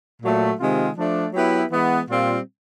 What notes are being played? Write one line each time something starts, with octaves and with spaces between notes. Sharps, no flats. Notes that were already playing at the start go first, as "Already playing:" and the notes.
A#2 F#3 A3
C3 D#3 G#3 C4 F4
F3 A3 D4
F#3 B3 E4 G4 B4
E3 G#3 B3
A#2 G3 C4 F4